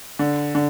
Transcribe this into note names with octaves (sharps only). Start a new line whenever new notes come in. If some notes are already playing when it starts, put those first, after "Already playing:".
D3
D3